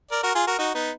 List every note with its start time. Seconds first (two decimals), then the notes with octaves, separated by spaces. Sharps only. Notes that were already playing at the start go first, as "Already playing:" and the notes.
0.11 A#4 D5
0.23 F#4 A#4
0.35 F4 G#4
0.47 F#4 A#4
0.58 D#4 F#4
0.74 B3 D#4